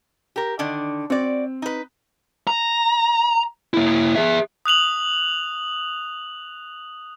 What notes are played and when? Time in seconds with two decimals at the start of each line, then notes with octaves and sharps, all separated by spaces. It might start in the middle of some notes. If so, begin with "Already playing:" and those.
0.36 G4 A#4
0.59 D3 D#3 D4
1.10 C4 F#4 D5
1.62 D#4 B4
2.47 A#5
3.74 A#3 E4
4.16 G#4 E5
4.65 D#6 F#6 F7 F#7